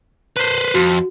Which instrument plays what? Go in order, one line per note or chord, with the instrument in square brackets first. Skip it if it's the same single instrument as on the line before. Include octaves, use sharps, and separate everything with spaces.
[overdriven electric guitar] B4 C5
[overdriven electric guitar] F2 [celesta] F#4